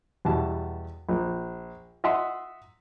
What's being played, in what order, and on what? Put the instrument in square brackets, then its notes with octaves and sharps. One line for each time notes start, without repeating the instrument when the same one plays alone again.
[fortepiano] E2 B2 G3 A5
A#1
D#5 E5 F#5 C6